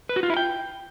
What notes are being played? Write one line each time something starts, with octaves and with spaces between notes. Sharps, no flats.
B4
F#4
F4
E4
G5